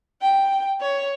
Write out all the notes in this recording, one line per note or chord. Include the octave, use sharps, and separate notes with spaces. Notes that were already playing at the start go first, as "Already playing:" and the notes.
G5
C#5